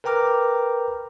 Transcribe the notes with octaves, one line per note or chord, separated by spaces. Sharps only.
A#4 B4 G5 A#5 D6 F6